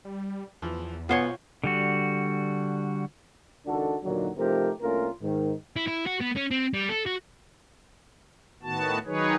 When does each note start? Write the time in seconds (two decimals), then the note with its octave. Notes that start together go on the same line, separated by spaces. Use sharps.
0.05 G3
0.62 E2 E3 F3
1.09 B1 B3 F4 C5 C#5 F#5 G#5
1.64 D3 G3 F#4
3.66 C#2 D#3 D4 F#4 A4
4.03 D#2 A#2 D3 D#3 F#3
4.37 C3 F3 A3 D#4 G4 A#4
4.81 C2 A3 A#3 C#4 F4 A#4
5.22 G#2 D#3
5.76 E4
5.87 E4
6.07 F#4
6.21 B3
6.37 C#4
6.51 C4
6.74 G3
6.89 A4
7.06 F#4
8.63 A2 D#3 B3 F#4 A5
9.06 D#3 F#3 D#4 G#4 B4 C#5